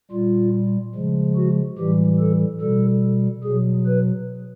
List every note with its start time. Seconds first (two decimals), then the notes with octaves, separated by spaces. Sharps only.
0.11 A#2 G3 F4
0.95 C#3 F3 G#3
1.36 F#4
1.78 A2 E3 G3 G4
2.20 A4
2.61 B2 G3 A4
3.44 B2 F#3 G#4
3.86 B4